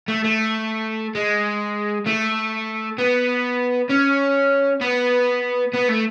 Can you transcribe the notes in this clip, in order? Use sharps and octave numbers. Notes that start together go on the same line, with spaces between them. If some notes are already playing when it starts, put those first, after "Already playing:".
A3
A3
G#3
A3
B3
C#4
B3
B3
A3